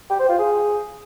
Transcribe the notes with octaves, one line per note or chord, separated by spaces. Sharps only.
G4
C5
F4
G#4